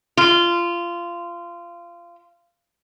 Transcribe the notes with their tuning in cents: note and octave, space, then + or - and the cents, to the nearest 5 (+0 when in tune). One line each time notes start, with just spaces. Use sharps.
F4 -20